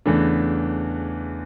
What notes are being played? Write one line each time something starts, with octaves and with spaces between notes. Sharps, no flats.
E2 C#3 E3 A3 D4